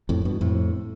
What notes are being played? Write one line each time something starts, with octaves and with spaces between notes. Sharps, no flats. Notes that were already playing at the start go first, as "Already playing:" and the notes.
F2 A2
G2 B2
F2 A2